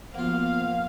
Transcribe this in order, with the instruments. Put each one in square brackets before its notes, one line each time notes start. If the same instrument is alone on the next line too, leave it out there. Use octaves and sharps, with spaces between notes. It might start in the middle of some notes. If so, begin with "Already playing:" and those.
[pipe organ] F3 B3 [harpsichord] A#3 F4 [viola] F5